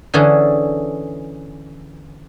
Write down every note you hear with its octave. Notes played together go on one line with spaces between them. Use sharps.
D3 E3 C#4 G#4 A4